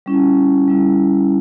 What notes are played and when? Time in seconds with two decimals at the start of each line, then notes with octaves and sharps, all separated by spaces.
0.06 G3 C#4 E4
0.68 G3 C#4 E4